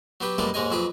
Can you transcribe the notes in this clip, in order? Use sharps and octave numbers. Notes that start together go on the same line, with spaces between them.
F#3 B3 G4 B4
F#2 G3 G#3 A#3 B3 A4
D#2 G#2 G#3 C#5 D#5 G#5
F2 F#3 G#4 B4 D6